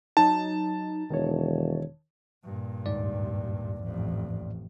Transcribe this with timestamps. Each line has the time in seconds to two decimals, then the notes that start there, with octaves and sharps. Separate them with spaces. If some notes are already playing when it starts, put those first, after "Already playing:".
0.17 F#3 D#4 A5
1.10 E1 D#3 C#5
2.45 G2 A#2
2.86 D#2 G#2 D5
3.84 A1 F2